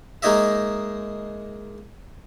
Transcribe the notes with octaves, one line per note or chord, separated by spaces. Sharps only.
G#3 A#3 D#4 C#5 D#5 E5